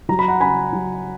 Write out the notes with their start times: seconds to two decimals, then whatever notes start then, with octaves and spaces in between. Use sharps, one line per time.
0.09 F#3 A#5
0.19 B5
0.28 F#5 A#5
0.41 C#3 G#5 B5
0.73 F#3